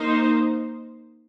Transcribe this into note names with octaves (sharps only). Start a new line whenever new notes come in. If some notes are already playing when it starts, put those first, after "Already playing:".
Already playing: A#3 D#4 C5